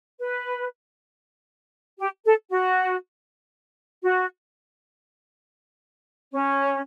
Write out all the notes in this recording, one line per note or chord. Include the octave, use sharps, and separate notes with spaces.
B4
G4
A4
F#4
F#4
C#4